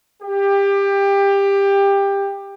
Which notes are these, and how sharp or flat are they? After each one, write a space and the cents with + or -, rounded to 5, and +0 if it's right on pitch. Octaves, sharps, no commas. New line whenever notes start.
G4 +20